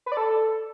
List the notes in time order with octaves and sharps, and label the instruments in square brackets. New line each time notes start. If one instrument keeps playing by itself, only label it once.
[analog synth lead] B4
D5
A4